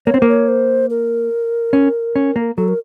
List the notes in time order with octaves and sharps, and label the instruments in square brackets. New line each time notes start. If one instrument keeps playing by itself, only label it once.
[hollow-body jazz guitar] A#3 [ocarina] C#5
[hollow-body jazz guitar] C4
[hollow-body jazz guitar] A#3 [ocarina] C5
[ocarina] C#5
C5
A#4
[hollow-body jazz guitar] C#4
C#4
A#3
[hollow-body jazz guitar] F#3 [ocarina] A4
[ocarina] A#4